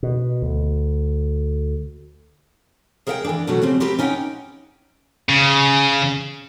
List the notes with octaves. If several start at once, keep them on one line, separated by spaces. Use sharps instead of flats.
B2
D2
G#4 A#4 C#5 E5 F#5 G5
E3 D4
B2 F#3 A3 F#4
C#3 G3 C4
C4 G4 A#4 B4
C#4 D#4 D5 E5 F#5 G5
C#3